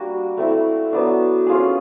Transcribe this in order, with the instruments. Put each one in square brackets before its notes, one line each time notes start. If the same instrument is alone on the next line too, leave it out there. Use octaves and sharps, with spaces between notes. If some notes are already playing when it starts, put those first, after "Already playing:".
Already playing: [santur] G3 A#3 D4 F#4
A3 C4 E4
F#3 B3 D4
C#4 F4 G#4